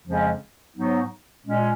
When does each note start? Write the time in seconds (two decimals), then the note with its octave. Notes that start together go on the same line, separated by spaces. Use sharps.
0.05 F2 C#3 F3 G#3 C#4
0.75 G#2 F#3 B3 D#4
1.46 A#2 G#3 C#4